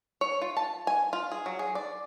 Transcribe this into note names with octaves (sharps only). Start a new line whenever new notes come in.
C#5
F4
A5
G#5
F4
G#4
F#3
G#4
D5